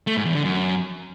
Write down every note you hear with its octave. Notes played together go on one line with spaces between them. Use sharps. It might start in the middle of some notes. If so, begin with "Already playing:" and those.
A3
G#2
E2
D3
F#2